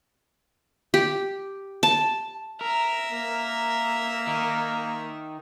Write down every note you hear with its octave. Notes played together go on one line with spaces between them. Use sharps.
G4
A5
A#4 E5 A#5
A#3
D#3